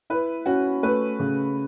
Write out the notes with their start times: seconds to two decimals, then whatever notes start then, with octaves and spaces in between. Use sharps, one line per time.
0.10 E4 B4
0.46 C#4 F#4
0.83 A3 B4
1.20 C#3